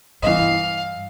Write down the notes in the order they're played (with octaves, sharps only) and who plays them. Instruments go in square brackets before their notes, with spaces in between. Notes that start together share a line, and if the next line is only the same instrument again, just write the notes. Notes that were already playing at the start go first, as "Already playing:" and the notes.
[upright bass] G2 [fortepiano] E3 D#5 [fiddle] F5